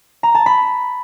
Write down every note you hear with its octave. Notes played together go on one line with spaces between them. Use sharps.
A#5
A5
B5